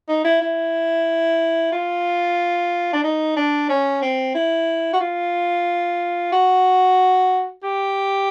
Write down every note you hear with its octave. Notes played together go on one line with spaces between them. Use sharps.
D#4
E4
E4
F4
D4
D#4
D4
C#4
C4
E4
F#4
F4
F#4
G4